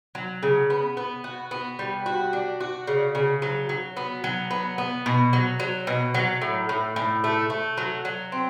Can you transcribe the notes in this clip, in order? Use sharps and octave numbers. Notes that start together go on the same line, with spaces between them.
F#3
C#3
B3
B3
F#4
B3
G3
F#4
D4
F#4
C#3
C#3
F#3
F#3
B3
F#3
B3
B3
B2
F#3
F#3
B2
F#3
A2
A2
A2
A3
A3
F#3
F#3
C4